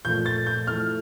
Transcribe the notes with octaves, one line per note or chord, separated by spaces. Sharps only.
A#2 F3 A3 G6
A6
G6
F3 A3 E4 F6